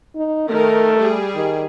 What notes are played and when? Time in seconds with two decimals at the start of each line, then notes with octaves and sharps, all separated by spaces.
0.16 D#4
0.49 D#3 A3 A#4
0.98 G3 G#4
1.36 D#3